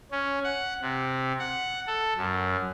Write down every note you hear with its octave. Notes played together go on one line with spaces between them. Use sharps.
C#4
F#5
C3
F#5
A4
F#2